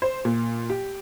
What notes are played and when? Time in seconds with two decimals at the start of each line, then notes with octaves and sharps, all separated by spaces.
0.02 C5
0.25 A#2
0.70 G4